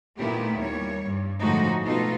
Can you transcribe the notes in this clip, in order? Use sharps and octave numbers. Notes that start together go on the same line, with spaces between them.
A#2 D#3 A3 B3 E4 G4
D#2 G3 C#5
G2
A2 D3 F3 G#3 D#4 F#4
B2 A3 D#4 F4 A4